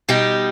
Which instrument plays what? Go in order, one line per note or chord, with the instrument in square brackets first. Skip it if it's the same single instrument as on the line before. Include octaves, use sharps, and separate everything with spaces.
[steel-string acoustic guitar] B2 G3 D#4 G4